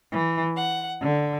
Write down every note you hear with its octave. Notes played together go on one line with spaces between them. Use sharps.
E3
F#5
D3